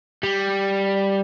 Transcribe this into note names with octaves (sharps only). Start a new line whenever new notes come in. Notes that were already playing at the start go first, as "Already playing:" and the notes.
G3